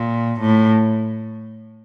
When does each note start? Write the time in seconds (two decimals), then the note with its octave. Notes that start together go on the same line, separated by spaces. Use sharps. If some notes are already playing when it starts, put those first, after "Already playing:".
Already playing: A#2
0.41 A2